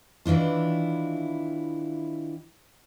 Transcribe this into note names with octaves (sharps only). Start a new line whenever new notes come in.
D#3 E3 D4 E4 F4